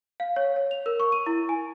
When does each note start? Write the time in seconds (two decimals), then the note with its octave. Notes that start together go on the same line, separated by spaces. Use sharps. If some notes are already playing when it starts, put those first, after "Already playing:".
0.20 F5
0.36 C#5
0.56 C#5
0.71 F7
0.86 A#4
1.00 C#6
1.12 D#7
1.26 E4
1.49 G#5